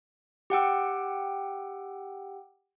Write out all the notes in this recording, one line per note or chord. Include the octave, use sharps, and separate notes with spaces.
G4 F#5 G5 E6